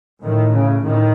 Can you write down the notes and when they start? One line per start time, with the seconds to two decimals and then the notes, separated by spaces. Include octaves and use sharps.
0.21 A2 D#3
0.51 C#3
0.82 A2 D#3